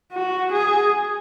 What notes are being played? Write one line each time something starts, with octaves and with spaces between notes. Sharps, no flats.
F#4
G#4